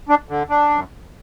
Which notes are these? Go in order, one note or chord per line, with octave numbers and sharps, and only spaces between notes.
D4
D3
D4
F#2